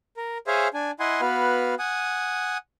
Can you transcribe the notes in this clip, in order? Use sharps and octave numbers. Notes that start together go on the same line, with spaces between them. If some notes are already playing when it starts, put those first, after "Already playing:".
A#4
G#4 C5 C#5 E5 F5 G#5
D4 G#5
E4 D#5 F#5 G#5 C6
B3 F#4 B4 F5
F#5 G#5 D#6